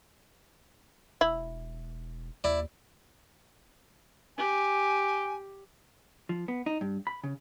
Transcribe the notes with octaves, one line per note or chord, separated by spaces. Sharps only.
E1 E4
D#2 E4 D5
G4 G#5
F3
B3
D#4
G2
B5
C#3